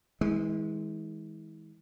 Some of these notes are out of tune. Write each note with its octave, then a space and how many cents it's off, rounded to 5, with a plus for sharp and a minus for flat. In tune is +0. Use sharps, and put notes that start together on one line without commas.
E3 -40 G#3 +0